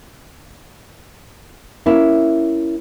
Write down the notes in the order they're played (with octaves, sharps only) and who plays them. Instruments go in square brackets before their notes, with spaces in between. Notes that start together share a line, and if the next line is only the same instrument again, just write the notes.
[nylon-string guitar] A#3 C#4 E4